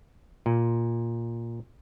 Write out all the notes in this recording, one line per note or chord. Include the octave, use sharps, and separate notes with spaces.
A#2